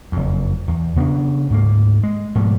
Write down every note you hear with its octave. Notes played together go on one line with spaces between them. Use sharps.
F#1 F2
E2
C#3 B3 C4 D4
D2 G#2 A3 A#3
G#3
G#2 B2 F3 G3